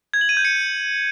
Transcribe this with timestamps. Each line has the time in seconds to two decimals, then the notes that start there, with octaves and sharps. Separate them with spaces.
0.14 G#6
0.21 F#7
0.29 D#7
0.37 G6
0.45 C#7